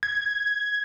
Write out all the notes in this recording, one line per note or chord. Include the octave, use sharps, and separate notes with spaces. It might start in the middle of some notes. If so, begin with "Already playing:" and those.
G#6